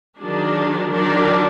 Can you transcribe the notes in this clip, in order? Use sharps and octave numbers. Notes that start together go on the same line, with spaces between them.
D#3 F#3 D4 G#4
D#3 F#3 D4